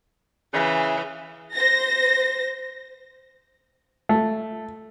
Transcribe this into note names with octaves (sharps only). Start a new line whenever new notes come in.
C#3 E3
C5 A#6
A3